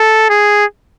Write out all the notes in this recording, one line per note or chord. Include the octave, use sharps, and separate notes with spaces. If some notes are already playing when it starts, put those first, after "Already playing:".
Already playing: A4
G#4